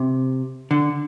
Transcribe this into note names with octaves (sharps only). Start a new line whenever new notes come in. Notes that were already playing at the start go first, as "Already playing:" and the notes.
Already playing: C3
D3